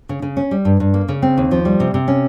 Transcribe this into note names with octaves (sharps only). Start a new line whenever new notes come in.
C#3
C#3
C#4
G3
G2
G2
A#3
C#3
C4
D#2
F3
G3
C3
C3
C#4